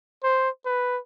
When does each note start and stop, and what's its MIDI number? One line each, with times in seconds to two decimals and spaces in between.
0.23 0.49 72
0.65 0.99 71